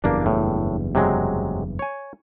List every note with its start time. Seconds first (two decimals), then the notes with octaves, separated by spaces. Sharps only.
0.04 F#1 E2 G2 A#3 D4
0.26 A2
0.95 C3 F#3 G#3
1.79 C#5 G#5